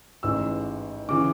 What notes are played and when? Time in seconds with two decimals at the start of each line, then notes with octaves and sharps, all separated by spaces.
0.23 A1 G#2 E3 E6
1.09 C#3 E3 D6